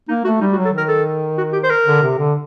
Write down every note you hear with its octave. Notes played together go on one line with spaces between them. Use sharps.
A#3 D#4
A3 F#4
G3 D#4
F#4
F#3
A4
D#3 A#4
A4
F#4
G4
C5
A#4
D3
C3
D3